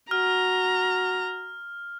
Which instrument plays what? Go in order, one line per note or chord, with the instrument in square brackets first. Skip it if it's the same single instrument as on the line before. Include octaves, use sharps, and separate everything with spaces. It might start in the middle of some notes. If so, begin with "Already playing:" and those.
[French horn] F#4 [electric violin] A#5 [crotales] F6